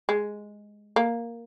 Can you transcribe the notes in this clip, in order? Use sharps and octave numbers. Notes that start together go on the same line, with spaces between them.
G#3
A#3